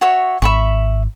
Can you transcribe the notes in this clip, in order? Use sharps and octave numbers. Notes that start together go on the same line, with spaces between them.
F#4 C#5 E5
G#1 E5 B5 C#6